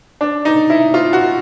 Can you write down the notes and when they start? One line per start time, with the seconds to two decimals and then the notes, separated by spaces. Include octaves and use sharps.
0.21 D4
0.45 D#4
0.70 E4
0.94 F4
1.13 F#4